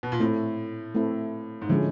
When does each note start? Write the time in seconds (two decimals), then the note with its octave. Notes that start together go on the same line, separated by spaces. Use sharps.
0.03 B2
0.12 A#2
0.20 A2 A3 C4 E4
0.95 A3 C4 E4
1.62 G#2
1.69 A2 D3 F3 G#3 C#4